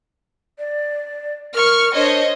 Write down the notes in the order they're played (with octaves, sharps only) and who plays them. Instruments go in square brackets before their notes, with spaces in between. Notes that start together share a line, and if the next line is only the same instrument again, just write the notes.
[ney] D5
[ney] A#4 [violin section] C#6 F6
[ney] D4 [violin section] C5 C#5 D#5